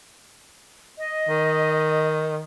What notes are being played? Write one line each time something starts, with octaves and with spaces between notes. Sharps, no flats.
D#5
D#3